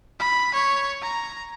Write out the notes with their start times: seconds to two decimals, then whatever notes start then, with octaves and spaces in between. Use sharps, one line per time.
0.20 B5
0.54 C#5
1.02 A#5